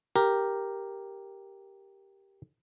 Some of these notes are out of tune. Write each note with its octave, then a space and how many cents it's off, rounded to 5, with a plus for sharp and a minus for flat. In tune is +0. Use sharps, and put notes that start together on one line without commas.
G4 +0 A#4 +0